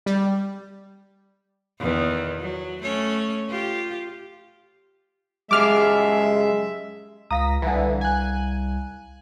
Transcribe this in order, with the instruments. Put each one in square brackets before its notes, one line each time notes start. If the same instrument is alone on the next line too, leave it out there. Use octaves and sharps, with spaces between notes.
[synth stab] G3
[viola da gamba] E2 D#3
F#3
A3 C#4 C#5
F4 G4
[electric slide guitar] F#2 G4 G#4 [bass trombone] G#3 [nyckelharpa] E5 [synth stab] D6 F6
[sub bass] C#2 [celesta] F5 A#5 [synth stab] D#6 A#6 B6
[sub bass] C2 [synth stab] D3 E3
[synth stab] G#5 F#6